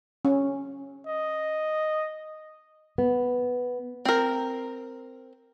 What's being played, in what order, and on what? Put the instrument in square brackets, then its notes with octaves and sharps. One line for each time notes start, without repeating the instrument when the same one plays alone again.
[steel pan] C#4
[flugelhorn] D#5
[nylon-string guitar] B3
[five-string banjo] C4 A#4